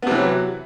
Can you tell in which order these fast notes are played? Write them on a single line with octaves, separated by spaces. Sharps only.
B3 C3 E3 F#3